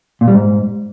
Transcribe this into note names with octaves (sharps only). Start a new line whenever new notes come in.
A#2
G3
G#2